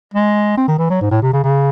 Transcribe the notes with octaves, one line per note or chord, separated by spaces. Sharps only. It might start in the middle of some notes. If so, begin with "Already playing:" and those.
G#3
C4
D#3
E3
F#3
G#2
A2
C3
C#3
C#3